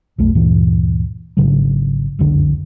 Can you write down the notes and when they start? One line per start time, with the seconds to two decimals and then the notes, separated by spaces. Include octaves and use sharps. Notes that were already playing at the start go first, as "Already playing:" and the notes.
0.18 B1 F2 A3
0.35 D2 G2 A#2 E3
1.37 G#1 G#2 C#3 F#3
2.19 F#1 C2 F2 D3